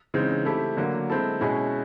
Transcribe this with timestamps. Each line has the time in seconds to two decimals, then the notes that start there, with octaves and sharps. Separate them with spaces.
0.14 C#3 E3 G#3 C4 D#4
0.45 A3 C4 E4 G4
0.77 D3 F#3 A#3
1.10 G#3 C4 E4 A4
1.41 B2 G#3 C#4 E4 G#4